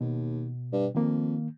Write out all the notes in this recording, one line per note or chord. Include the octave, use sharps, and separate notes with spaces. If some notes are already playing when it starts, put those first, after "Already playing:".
D#2 B2
G2
F2 D#3 A#3